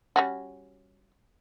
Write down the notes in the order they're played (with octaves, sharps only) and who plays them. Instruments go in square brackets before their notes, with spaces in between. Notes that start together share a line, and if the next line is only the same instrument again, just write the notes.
[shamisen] G3 C#4 F#4